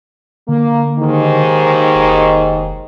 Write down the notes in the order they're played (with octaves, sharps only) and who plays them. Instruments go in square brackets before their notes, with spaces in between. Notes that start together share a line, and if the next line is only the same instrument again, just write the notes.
[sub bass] D3 [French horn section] A#3
[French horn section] D#2 G#2 D#3
[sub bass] F1